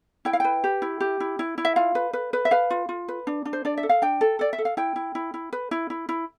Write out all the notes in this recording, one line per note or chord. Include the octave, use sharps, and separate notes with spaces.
E4 G5
F5
B4 G5
G4
E4
G4
E4
E4
E4
E5
F4 F5
B4
B4
B4
E5
B4 F5
F4
F4
B4
D4
D4
C5
D4 D5
E5
A4
F5
D4 G5
A4
A4 D5
E5
A4
F5
E4 G5
E4
E4
E4
B4
E4
E4
E4